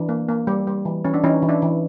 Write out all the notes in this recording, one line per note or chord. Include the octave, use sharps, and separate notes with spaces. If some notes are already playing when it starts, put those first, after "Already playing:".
Already playing: E3 D4
A#3
A#3
G3
G3
E3
E3 C#4
D4
E3 C#4 D#4
E3
D4 E4
E3